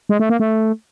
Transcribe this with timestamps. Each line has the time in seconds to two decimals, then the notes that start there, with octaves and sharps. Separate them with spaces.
0.09 G#3
0.19 A3
0.30 A#3
0.40 A3